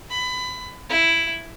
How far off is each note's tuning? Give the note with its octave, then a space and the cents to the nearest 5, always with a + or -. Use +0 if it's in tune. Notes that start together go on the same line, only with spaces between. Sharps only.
B5 +25
E4 +5